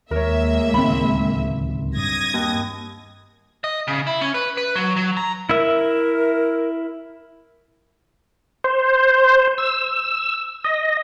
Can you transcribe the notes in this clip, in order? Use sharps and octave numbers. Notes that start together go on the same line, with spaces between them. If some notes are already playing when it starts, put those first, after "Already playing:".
D#2 G#3 A#3 A#4 C#5 E5
D1 C#2 D#3 C4 B5
G2 D#6 G#6 A#6
D#2
D#5
C#3
E4
C#4
B4
B4
F#3
F#3
A#5
E4 A#4 E5
C5
E6
D#5